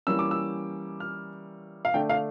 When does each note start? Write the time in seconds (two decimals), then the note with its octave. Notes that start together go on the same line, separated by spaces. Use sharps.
0.07 E3 G3 A#3 C#4 E6
0.19 D6
0.31 E6
1.00 F6
1.85 F5
1.94 D3 A3 D4 G5
2.09 F5